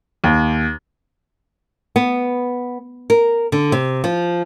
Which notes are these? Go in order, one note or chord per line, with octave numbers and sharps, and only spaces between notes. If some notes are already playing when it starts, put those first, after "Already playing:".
D#2
B3
A#4
D3
C3
F3